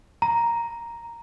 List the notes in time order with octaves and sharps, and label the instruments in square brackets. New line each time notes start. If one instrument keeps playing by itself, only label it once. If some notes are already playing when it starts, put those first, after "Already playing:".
[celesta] A#5